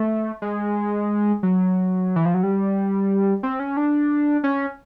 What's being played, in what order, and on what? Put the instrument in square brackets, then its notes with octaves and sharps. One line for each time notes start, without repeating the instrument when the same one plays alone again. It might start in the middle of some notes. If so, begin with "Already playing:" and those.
Already playing: [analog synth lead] A3
G#3
F#3
E3
F3
F#3
G3
C4
C#4
D4
C#4